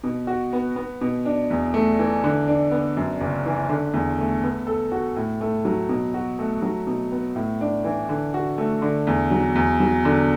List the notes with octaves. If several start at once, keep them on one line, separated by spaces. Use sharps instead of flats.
B2
F#4
B3
B3
B2
D4
E2
A3
E3
D3
D4
B3
F#2
F#1
E3
D3
E2
A3
B3
A4
F#4
A2
A3
F#3
B2
F#4
A3
F#3
B2
B3
A2
D4
E3
D3
F#4
A3
D3
E2
F#3
E2
F#3
D3